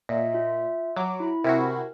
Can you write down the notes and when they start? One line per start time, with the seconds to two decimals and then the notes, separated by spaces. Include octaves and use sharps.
0.09 A#2 D#5 E5
0.33 F4 E5
0.97 F#3 D6
1.20 E4 B5
1.44 C3 E4 F#4 A#4 G#5